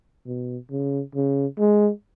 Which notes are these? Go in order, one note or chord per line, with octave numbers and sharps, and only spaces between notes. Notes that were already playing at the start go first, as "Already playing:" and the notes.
B2
C#3
C#3
G#3